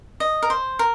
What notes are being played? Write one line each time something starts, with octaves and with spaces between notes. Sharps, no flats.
D#5
A#4
C5
A#4